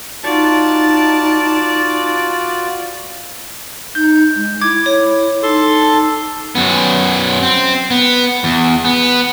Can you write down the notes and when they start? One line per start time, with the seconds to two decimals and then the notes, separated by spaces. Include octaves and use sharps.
0.24 D#4 F4 F#4 D5 A5
3.95 D#4 G6
4.35 G#3
4.61 E4 D6 G#6
4.86 C#5
5.43 D#4 A4 A5 C6
6.55 F#2 B3
7.43 C4
7.91 B3
8.44 E2
8.85 B3